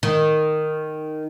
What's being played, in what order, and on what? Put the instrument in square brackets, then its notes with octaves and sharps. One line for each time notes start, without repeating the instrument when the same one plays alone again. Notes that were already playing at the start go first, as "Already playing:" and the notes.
[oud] D#3